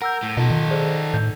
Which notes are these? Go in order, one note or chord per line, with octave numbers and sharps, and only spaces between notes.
A#4 F#5 E6 G6
A2
B2 D#4 F4 A4
D#3
G#4 C5 D5
A2 G6